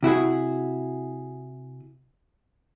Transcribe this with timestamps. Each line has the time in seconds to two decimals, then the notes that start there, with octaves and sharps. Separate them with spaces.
0.03 C3 E4 F#4 G#4